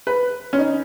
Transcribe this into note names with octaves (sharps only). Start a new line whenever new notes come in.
B4
C#4
D#4